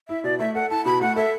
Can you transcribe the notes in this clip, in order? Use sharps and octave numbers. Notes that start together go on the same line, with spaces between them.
E4 E5
B2 D5
A3 E5
A4 F#5
E4 A5
B2 B5
A3 F#5
A4 E5